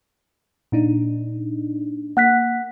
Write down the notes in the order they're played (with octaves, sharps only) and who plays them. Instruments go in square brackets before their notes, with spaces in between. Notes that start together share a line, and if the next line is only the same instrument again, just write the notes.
[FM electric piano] A#2 D4 D#4
[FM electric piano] A#3 [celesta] F#5 F#6 B6